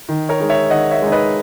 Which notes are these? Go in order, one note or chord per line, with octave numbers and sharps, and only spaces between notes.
D#3
A#4 C#5
G#3 D#4
C#5 E5
D#3 D#5 F#5
C#5 E5
G#3 D#4
B4 D#5